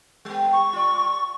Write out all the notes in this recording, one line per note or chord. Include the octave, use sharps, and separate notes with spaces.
G3 B3
C#6
F4 D5